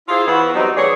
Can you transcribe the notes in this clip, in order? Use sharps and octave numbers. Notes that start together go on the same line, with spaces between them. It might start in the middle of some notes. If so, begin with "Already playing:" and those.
E4 F4 G#4 C5 E5 F5
E3 B3 E4 F#4 B4
F#3 G3 C4 D#4
E3 A3 G#4 C#5 D5